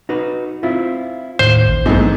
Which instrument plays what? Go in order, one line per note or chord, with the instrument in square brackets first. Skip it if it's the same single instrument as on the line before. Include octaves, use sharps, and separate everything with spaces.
[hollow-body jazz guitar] D#4 F#4 B4
C4 E4 F4
[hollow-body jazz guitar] D#2 [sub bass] A2 [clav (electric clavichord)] C5
[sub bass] A1
[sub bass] A#1 [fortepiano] E2 G#2 [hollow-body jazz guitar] F#3 A3 C4